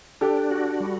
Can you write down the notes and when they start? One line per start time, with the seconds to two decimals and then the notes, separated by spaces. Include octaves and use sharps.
0.21 D4 G4 A4
0.51 F#4
0.80 G3